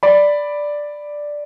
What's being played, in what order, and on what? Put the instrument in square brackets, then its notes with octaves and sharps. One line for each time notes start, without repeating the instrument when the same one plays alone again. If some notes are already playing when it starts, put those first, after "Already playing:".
[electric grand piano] D5 B5